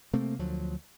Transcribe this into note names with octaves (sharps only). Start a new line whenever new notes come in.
C3 A3 A#3 C4
D2 F3 F#3